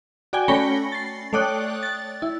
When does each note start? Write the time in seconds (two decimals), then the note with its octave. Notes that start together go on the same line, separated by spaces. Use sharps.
0.33 F#4 D5 G5 G#5
0.48 A3 C#4 B5 A#6 C#7 G7
0.92 A6 C7
1.33 A3 C#5 D5 G5 D#6 F#6
1.83 A6
2.22 E4